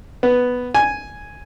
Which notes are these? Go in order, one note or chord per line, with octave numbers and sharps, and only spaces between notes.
B3
G#5